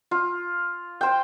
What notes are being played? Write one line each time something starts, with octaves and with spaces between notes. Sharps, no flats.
F4
C5 G5